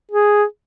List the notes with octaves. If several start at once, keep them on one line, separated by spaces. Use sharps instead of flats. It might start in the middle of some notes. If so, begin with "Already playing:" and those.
G#4